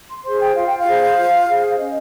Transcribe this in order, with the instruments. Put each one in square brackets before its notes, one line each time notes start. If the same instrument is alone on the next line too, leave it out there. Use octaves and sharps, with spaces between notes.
[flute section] C6
G#4 C5 C6
G5
F4 F5
G5
F5
G#4 C5
F4
G#4 C5
C#4 D#5